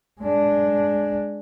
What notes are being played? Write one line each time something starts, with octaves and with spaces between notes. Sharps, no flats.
G#3 D4